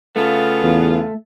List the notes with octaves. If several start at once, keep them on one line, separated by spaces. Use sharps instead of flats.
C#3 A3 B3 F4
E2